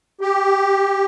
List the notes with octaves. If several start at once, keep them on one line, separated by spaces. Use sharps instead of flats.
G4